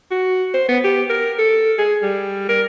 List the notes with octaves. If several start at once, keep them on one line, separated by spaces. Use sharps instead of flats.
F#4
C5
B3
G4
A#4
A4
G#4
G3
A#4